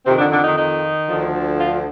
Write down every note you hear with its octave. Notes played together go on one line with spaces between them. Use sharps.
F2 C3 D#3 C4
D3 D4
D3 D4
D#3 D#4
D#3 D#4
D2 D3 F3
F4